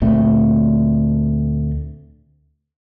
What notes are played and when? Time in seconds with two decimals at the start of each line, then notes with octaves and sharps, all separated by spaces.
0.02 D2 A#2 A3 C4